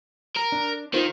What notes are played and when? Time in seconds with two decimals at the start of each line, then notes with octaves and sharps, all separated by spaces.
0.36 A#4
0.52 D4
0.94 D#3 F4 A#4 C5